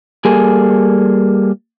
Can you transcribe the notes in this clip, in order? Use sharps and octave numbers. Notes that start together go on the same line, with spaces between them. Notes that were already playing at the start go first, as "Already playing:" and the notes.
G3 A#3 G#4 A4 G#5